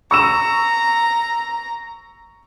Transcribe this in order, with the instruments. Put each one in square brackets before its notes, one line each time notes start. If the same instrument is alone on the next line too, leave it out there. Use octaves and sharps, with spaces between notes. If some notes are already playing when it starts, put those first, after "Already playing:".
[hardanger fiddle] A#5 [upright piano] C#6 E6 E7